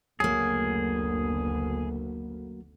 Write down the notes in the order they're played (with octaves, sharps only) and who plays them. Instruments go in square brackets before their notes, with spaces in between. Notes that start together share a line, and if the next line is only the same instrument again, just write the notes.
[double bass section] F#1 D2 B3 [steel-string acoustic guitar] F#3 A#3 [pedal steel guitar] G#4